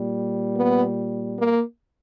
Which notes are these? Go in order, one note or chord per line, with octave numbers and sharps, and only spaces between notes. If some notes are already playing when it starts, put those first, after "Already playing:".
Already playing: A#2 G3
B3
A#3